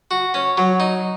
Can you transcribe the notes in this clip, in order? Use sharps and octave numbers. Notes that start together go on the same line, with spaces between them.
F#4
C#4
F#3
D#4